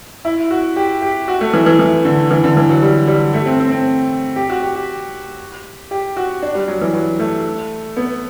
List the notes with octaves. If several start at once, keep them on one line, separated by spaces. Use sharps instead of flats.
E4
F#4
G4
G4
F#4
A3
E3
E3
E3
D3
E3
D3
E3
F#3
G3
G3
A3
C4
C4
C4
G4
F#4
G4
G4
G4
F#4
D4
G3
F#3
E3
F#3
A3
B3